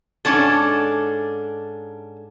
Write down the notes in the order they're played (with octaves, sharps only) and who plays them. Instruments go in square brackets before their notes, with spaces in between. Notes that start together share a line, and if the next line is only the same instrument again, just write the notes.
[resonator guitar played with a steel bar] G#2 E3 C#4 D4 A4